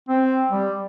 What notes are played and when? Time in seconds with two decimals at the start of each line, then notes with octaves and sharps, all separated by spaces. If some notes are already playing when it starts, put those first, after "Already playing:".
0.09 C4
0.51 G3